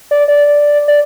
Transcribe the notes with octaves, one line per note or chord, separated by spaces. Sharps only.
D5
D5
D5